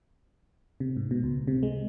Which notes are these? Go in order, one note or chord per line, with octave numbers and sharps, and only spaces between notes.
C3
G#2
B2
C#2
C3
G#3